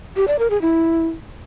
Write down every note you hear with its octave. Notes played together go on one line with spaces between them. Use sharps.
G4
D5
A#4
G#4
E4